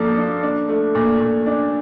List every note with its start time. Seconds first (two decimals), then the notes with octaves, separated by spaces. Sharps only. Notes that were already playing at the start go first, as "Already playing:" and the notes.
Already playing: F3 A#3 D4 A4
0.17 D4
0.43 D4
0.68 A3
0.95 A#2
1.20 A#2
1.46 D4